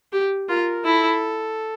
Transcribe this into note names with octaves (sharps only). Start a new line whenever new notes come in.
G4
F4 A#4
E4 A4